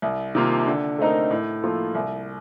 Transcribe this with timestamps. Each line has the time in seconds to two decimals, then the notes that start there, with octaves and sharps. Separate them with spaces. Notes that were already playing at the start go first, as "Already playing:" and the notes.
0.02 C2
0.35 C3 D#3 A#3 F4
0.67 D3
0.99 A3 C4 D#4 A#4
1.31 A2
1.62 F3 A#3 F4 A4
1.95 C2